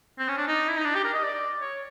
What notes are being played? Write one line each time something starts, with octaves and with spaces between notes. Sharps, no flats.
C4
C#4
D4
D#4
E4
D#4
D4
G4
A#4
D#5
D5
C#5